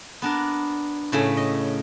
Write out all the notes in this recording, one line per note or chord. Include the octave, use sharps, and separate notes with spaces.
B3 D4 A#4
A2 C#3 A3
D#5